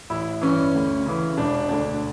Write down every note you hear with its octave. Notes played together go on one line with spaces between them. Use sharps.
A1 E4
G2 E3 C#4
D2
C#3 E3
E1 D4
D2 D3 D4